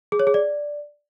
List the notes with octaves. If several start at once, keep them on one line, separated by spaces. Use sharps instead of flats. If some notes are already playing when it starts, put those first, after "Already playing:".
G#4
C#5
G#4
D5